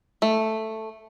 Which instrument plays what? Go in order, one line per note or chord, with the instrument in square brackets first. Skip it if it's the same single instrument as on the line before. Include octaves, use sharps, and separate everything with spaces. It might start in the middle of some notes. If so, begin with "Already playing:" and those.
[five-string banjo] A3